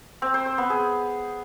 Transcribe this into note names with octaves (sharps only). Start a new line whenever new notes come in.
C4
C5
C5
B3
G#4